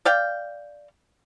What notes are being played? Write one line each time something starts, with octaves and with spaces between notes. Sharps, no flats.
D5 F5 G5